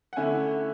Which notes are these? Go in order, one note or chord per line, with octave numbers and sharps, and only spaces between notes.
F#5
D3 A3 C#4 E4 G#5